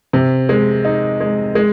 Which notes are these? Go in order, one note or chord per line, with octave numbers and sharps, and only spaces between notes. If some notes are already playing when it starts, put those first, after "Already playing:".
C3
G#3
D#4
G#3
G#3